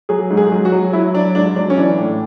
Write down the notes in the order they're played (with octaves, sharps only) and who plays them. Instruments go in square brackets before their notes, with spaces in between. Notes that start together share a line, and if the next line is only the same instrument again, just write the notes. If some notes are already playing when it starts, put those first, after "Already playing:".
[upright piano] F#3 G#4
G#2
G#4
F#3
F#4
F#3
F#3 E4
F#3 D4
G#2 D4
F#3 D4
C#4
E3 D4
A2